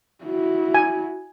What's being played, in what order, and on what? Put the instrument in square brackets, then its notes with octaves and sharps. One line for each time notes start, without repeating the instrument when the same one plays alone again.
[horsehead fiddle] E4 F#4
[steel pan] G#5